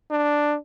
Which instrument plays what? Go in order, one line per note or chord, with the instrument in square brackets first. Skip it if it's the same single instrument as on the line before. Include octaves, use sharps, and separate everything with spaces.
[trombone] D4